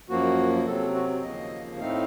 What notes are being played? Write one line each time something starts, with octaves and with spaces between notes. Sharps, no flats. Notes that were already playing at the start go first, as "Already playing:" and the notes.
F#2 F3 A#3 F#4
C3 F#3 C4 A4
F#4
D#2 C#3 F3 A#3 D#5
A2 A3 C4 D#4 F5